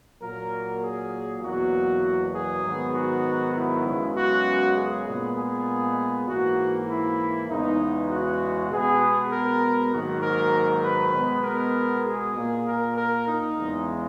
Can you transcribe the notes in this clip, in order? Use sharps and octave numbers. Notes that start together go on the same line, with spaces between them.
A#2 F#3 A#3 A#4
G#4
E2 B2 F#3 A#3 F#4
G#4
G#2 D#3 F#3 B3
F#4
E4
F#2 C#3 G#3 B3
F#4
G#4
A#2 G#3 B3
G#4
G#2 E3 A#3 F#4
E4
E2 C#3 G#3 B3 D#4
F#4
B2 G#3 B3 G#4
A#4
G#2 D#3 F#3 A#3 F#4
A#4
B4
B2 G#3 B3
A#4
G#4
A#2 A#3
A#4
A#4
D#4
E2 C#3 G#3